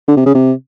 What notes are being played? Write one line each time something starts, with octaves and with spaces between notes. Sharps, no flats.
D3
C3
C#3
C3